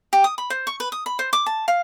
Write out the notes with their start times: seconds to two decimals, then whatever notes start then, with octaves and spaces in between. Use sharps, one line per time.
0.13 G4
0.24 D#6
0.38 B5
0.50 C5
0.67 C#6
0.80 B4
0.92 D#6
1.06 B5
1.19 C5
1.33 D6
1.46 A5
1.68 F5